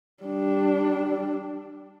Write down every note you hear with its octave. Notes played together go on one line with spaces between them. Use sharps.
G3 D4